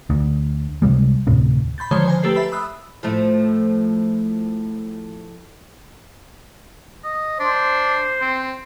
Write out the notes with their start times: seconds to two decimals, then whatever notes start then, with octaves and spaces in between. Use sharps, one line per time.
0.10 D2
0.82 C#2 C3 G3 G#3
1.27 D2 A2 C3
1.78 B5 C6 G6 A6
1.91 D3 D#3 F3 G#3 C5 C#5
2.06 C5 G#5 A#5
2.23 A3 G4 A4 B4 C7
2.36 E5 B5
2.52 B5 D#6 E6 F#6
3.03 A2 F3 A3
7.04 D#5
7.40 D4 C5
8.21 C4